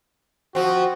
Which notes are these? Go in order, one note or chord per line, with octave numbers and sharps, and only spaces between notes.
F3 C4 F#4